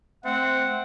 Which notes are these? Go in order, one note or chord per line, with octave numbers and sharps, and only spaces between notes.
A3 C4 F#5